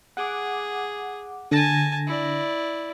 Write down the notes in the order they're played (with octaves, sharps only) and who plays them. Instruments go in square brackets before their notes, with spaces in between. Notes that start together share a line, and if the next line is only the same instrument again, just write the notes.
[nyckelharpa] G#4 [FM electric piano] F#5 D6
[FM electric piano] D3 A#6 [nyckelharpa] G#5 A5
[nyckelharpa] E4 D5